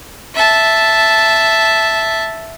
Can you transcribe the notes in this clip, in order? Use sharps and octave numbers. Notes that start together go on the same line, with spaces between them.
E5 A5